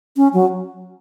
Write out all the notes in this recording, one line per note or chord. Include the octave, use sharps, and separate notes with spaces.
C#4
F#3